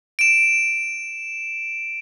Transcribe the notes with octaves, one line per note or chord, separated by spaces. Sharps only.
D7 E7